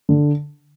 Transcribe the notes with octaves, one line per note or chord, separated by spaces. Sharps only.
D3